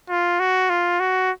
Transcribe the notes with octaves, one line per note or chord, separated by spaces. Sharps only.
F4
F#4
F4
F#4